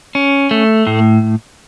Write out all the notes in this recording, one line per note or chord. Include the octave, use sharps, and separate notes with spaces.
C#4
A3
A2